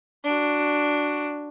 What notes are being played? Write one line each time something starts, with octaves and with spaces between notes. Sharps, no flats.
D4 F#4